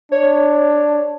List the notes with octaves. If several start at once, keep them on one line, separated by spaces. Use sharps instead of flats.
D4 C#5